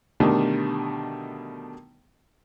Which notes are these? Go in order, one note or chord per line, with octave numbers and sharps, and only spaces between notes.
B2 D3 D#3 G3 A3